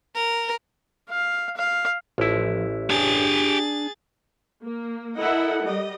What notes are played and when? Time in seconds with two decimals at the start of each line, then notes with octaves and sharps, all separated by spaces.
0.15 A#4
1.10 F5
1.57 F5
2.18 A1 F3 E4
2.90 D4 G4 G#4 G#5 A6
4.63 A#3
5.17 E4 A4 A#4 D#5 F#5
5.64 G3 D#5